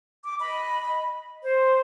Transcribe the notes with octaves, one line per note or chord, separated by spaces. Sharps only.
D6
D#5 B5
C5